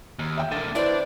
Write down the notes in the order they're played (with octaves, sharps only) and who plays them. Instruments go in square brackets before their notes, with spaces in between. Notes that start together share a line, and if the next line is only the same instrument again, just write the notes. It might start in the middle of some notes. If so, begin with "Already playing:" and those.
[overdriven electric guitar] D#2
[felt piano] E5 G5
[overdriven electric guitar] D3 A#3 [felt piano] A6
[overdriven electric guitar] D4 [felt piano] E4 B4 C5 [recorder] D5